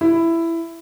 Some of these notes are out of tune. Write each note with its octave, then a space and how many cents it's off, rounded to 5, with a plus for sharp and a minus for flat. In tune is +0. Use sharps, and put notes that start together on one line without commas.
E4 +10